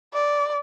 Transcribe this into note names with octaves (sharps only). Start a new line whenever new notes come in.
D5